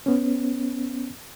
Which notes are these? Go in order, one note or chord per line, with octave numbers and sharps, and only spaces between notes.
B3 C#4